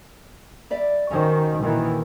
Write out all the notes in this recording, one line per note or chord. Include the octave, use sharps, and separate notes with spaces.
G3 D5 E5
D#3 C#4 F#4 C5
A#2 D#3 E3